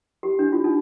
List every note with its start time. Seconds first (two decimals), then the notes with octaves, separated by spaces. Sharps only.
0.23 G4
0.39 D4
0.52 F4
0.64 D#4